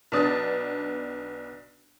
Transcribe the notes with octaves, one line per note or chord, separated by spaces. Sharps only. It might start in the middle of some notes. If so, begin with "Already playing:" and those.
B1 B3 D4 D#6 A6